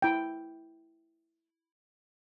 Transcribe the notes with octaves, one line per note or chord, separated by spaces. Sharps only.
E4 G5